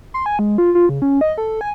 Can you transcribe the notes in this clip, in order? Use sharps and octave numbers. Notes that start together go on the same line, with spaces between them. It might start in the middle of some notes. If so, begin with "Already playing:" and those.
C6
G#5
G#3
F4
F4
C#3
C#4
D#5
A4
G#5